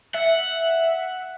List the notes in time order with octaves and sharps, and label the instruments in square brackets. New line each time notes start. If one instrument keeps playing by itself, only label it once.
[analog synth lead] E5 [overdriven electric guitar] F#5